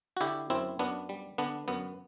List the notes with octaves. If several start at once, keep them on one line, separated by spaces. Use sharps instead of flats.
F#4
D3 E4 G4
F#2 C4 E4
F#2 B3 D4
G3
D3 B3 D4
F#2 B3